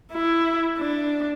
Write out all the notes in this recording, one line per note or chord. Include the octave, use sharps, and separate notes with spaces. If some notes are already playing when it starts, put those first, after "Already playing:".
E4
D4